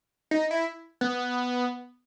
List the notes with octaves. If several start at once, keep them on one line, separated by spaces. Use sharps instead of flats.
D#4
E4
B3